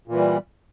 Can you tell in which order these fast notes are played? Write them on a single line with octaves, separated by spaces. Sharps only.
A#2 E3 G3